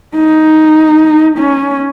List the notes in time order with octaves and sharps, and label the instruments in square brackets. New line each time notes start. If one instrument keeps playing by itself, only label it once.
[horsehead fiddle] D#4
C#4